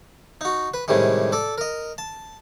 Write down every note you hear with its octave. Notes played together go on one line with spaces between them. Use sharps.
D#4 F#4
B4
A2 C3 D#3 G3 G#3
A4 D5
A#4 D#5
A5